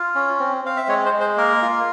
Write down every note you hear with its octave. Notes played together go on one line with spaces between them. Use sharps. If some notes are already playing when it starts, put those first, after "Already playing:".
Already playing: F4
C#4
C4
C4 F5
E5
G#3 C#5
C5
G#3
C5
A#3 A#4
F4